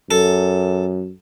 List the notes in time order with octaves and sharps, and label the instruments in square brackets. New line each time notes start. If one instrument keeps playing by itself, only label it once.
[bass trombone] F#2 [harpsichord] A4